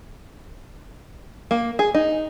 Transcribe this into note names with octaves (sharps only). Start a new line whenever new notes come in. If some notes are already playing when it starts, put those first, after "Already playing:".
A#3
G#4
D#4